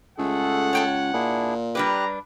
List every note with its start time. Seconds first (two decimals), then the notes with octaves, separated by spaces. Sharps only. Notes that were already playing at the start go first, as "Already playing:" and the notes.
0.18 C#2 A3 G#4 A4 F#5
0.73 C#5 G5 A5
1.13 A#2 D4 E4 G#4
1.75 G3 D4 G4 B4 A#5 F#6